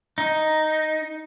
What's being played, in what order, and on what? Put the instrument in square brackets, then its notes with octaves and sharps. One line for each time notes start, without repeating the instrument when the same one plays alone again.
[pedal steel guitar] D#4